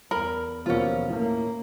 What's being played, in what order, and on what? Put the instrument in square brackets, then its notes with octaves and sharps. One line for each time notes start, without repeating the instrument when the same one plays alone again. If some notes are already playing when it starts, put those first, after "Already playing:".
[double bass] E2 [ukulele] A#4 B5
[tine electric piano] D#2 F3 A#3 [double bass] B2 E3 [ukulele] C#4 F4
[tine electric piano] A2 [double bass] A#3